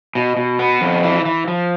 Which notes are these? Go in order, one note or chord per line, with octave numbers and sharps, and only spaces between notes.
B2
B2
B3
F2
E3
E3
F3